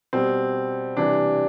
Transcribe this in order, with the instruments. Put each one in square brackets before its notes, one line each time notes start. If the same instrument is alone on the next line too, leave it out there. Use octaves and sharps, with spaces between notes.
[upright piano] B2 G3 C4
C3 E3 G3 D4